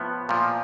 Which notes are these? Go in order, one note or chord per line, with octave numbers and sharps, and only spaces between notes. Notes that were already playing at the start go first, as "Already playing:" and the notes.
Already playing: A2 F3 B3
A#2 F3